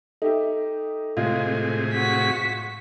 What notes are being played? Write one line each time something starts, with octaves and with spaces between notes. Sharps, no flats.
D#4 G4 A4 E5
A2 C3 G#3 F4 G#4
F#4 B6